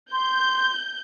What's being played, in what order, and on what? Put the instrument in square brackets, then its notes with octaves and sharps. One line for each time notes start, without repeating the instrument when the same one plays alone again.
[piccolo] C6 [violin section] G6